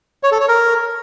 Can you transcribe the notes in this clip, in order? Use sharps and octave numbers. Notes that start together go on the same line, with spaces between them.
C#5
A4
C#5
A#4